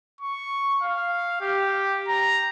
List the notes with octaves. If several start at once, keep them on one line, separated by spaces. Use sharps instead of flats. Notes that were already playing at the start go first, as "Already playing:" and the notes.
C#6
F5
G4
A#5